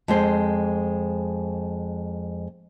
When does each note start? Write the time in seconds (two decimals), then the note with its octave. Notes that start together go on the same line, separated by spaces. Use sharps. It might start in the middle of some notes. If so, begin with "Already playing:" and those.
0.08 F2 G#3 C5